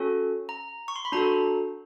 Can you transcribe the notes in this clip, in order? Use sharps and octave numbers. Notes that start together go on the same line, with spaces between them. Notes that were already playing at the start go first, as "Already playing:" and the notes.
Already playing: C#4 F#4 A4
A#5
C#6
C6
B5
D4 F#4 A4 A#5